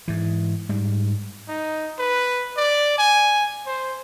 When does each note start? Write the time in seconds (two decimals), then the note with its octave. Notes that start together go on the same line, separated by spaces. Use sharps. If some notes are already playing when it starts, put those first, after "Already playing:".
0.08 G#2 E3
0.69 G#2 G3
1.49 D#4
1.99 B4
2.57 D5
2.98 G#5
3.67 C5